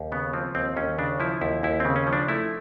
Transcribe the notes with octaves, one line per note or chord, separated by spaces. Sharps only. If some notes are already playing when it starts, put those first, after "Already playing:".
Already playing: D#2
C#3 B3
F3 C4
D#2 C4
D#2 C#4
C#3 D4
F3 E4
D#2 E4
D#2 E4
C#3 C4
C#4
F3
D4
A3 E4